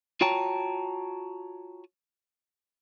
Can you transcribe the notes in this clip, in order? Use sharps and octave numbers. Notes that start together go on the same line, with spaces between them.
F4 F#4 C#5 G5 A5 A#5